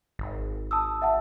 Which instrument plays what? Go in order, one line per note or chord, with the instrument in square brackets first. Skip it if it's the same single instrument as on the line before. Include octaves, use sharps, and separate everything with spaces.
[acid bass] G#1
[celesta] A5 D#6 E6
E5 F#5 A5